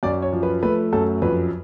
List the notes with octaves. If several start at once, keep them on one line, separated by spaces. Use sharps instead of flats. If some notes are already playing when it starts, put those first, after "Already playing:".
F#2 D5
C#5
F3
B4
A3 B4
F#2 A4
F2 B4